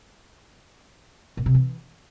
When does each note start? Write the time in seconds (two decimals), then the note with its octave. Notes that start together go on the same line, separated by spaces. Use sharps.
1.37 A#2
1.46 C3
1.54 E3